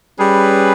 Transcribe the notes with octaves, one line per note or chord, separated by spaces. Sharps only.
G3 C#4 G#4 B4